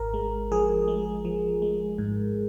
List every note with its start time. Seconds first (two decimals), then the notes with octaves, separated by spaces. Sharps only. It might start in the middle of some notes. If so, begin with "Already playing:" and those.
Already playing: G#1 A#4
0.14 G#3
0.52 F3 G#4
0.88 G#3
1.25 F3
1.62 G#3
1.98 G#2